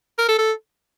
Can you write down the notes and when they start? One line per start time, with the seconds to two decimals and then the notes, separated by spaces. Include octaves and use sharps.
0.18 A#4
0.28 A4
0.38 A4